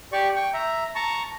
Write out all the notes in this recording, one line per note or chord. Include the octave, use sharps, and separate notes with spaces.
G4 D5 C#6
G5 C#6
E5 A#5
A5 A#5 C#6